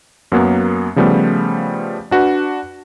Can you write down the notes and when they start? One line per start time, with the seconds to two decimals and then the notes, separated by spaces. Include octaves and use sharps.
0.32 F#2 F#3 A#3 B3
0.96 C#3 F3 G3 A3 B3
2.11 D4 F#4 B4